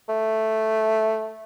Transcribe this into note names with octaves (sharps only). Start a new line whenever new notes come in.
A3